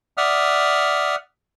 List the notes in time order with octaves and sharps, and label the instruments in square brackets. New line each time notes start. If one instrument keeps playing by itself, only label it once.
[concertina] D5 E5 F#5 D#6 F6